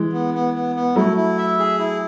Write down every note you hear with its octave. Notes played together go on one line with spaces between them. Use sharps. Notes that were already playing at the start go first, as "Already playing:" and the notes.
Already playing: E3 G#3
B3
B3
B3
B3
F#3 A3 E4
E4
E5
G#4
E4